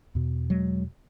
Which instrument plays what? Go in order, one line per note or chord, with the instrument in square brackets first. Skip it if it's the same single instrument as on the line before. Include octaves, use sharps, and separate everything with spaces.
[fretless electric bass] E2 B2
F#3 G#3